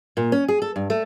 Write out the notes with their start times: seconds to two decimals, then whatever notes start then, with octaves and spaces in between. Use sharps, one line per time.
0.17 A#2
0.32 C#4
0.48 G#4
0.62 A4
0.76 G2
0.90 A3